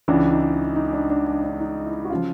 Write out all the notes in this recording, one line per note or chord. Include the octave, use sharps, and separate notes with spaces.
C#2 C#3 E3 D4
D#4
D#4
D4
D4
D4
D4
D#4
E4
F#4
C#3 F3 F4